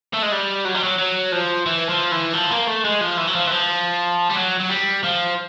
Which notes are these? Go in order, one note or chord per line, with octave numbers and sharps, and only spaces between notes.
A3
G#3
G3
F#3
G3
F#3
F#3
F3
E3
F3
E3
F3
A#3
A3
G#3
F3
E3
F#3
F3
E3
F3
G3
F#3
F#3
G3
F3